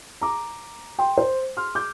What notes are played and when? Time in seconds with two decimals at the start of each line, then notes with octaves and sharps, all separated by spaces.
0.21 A#5 D6
0.99 G5 C6
1.18 C5
1.57 C6 F6
1.75 D6 G6